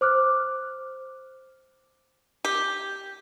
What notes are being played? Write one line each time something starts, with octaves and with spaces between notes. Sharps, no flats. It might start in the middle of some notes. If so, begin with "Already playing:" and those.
C5 D6 F6 F#6
G4